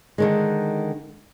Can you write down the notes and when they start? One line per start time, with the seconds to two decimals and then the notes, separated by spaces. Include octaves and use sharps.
0.18 D3 D#3 G#3